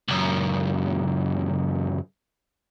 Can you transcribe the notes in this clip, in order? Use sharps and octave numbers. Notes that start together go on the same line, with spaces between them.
C#2 F#2